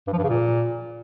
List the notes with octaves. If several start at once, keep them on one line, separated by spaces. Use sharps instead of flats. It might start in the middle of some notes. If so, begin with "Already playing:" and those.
G2
F3
G2
C#3
A#2